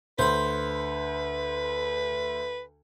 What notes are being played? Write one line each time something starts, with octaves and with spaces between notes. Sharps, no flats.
D2 B4 C5 B5